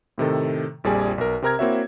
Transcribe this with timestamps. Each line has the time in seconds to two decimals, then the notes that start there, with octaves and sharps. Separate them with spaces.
0.18 A2 C3 D#3 A4
0.84 A#1 F2 G3 G#4 D5 G#5
1.18 B1 A#4
1.42 C3 C4 A#4 A#5 F6 G#6
1.59 A#3 C4 E4 F#4 C#5 E5